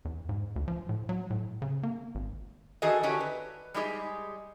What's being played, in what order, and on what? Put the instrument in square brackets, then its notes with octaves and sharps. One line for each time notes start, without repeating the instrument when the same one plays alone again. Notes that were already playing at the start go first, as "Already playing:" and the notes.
[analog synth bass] E2
G#2
D2
F3
A2
F#3
A2
C#3
A#3
G#1
[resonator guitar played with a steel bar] D#3 D4 F#4 G#4 A4 D#5
D3 C#4 F#4 G4
B4
G3 G#3 D#4 G4 G#4